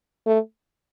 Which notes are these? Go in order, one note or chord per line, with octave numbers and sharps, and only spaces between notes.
A3